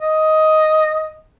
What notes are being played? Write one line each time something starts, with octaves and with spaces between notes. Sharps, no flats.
D#5